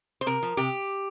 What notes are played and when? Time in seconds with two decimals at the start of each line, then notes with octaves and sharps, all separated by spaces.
0.21 C5
0.26 C3 A#4
0.43 F3
0.57 C3 G4